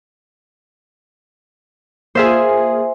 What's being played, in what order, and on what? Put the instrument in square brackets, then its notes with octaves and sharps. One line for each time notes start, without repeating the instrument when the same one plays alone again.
[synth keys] A#3 F4 G#4 [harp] C5 E5 G#5